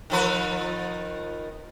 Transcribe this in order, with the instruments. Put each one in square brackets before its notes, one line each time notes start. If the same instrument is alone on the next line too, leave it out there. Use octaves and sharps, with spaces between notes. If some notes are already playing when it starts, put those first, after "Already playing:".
[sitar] D#3 F3 B4